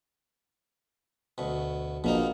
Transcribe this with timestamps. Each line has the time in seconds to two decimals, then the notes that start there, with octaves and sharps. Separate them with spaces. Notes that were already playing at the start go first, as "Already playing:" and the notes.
1.38 D2 B2
2.04 A#1 B2 A#3 D#4